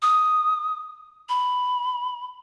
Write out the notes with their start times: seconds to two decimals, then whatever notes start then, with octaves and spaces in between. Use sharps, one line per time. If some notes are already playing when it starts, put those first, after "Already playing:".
0.02 D#6
1.29 B5